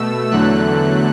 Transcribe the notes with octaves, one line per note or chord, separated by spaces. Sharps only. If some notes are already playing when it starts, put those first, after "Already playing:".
Already playing: B2 A3 E6
E2 D3 F#3 A3 F#6